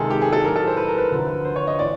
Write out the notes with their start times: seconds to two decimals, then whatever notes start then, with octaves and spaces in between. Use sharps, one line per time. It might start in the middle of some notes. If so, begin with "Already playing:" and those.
Already playing: C#2 C3 D#3 G#3 G#4 A4
0.10 G4
0.22 G#4
0.32 A4
0.44 A2 F#3 A#4
0.56 A4
0.67 C5
0.77 B4
0.88 A#4
0.98 B4
1.12 D2 D3 F3
1.45 C5
1.56 C#5
1.67 D#5
1.79 A2 E3 D5